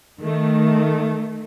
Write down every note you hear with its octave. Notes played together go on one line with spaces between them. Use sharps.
D#3 A3